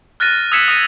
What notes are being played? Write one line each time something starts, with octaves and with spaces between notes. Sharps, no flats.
F6 F#6 A6 A#6 D#7
D#6 E6 G#6 B6 C#7 E7
D#6 A#6 D#7